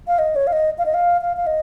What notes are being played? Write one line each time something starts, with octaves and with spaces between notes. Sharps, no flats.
F5
D#5
C#5
F5
D#5
F5
D#5
F5
F5
F5
D#5